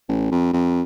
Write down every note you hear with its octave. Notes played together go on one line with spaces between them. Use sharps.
A1
F2
F2